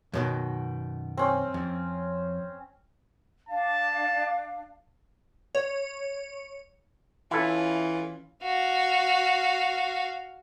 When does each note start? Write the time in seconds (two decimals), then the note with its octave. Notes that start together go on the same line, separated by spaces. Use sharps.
0.14 F#2 B2 D#3
1.17 C4 C#4
1.54 F2
3.49 D4 F5 A5
5.55 C#5
7.31 E3 C#4 E4 F4 A4
8.43 F#4 F5